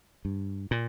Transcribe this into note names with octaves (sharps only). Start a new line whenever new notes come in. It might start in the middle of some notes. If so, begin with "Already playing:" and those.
G2
A#2